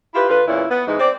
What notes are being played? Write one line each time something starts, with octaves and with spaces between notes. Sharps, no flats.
E4 F4 G4 B4
D3 F4 B4
E2 A#2 C#4 E4
B3
G#2 E3 G#3 D#4
C4 D5